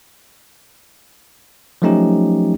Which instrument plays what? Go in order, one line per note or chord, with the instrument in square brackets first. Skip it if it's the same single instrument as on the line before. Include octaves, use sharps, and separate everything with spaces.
[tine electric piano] F3 F#3 A3 C#4 D#4 G4